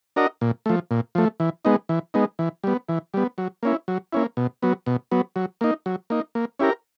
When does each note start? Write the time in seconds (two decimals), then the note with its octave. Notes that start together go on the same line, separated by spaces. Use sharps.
0.16 D4 F#4 A#4 D#5
0.41 A#2
0.66 F3 A3
0.91 A#2
1.15 F3 A3
1.40 E3
1.65 G#3 B3 D#4
1.89 E3
2.14 G#3 B3 D#4
2.39 E3
2.64 G3 B3
2.89 E3
3.14 G3 B3
3.38 F#3
3.63 A#3 C#4 E4
3.88 F#3
4.13 A#3 C#4 E4
4.37 B2
4.62 F#3 B3
4.86 B2
5.11 F#3 B3
5.36 F#3
5.61 A#3 D#4
5.86 F#3
6.10 A#3 D#4
6.35 A#3
6.59 C#4 E4 G4 A#4